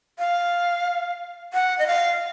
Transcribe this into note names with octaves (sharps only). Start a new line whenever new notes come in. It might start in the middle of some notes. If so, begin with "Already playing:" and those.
F5
F#5
D#5
F5